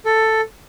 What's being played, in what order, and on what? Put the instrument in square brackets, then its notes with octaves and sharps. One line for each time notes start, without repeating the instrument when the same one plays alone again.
[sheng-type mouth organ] A4